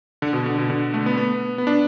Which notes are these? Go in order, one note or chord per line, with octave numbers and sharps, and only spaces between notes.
D3
B2
D3
B2
D3
A3
B3
B3
B3
D4